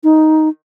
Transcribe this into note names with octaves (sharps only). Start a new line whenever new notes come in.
D#4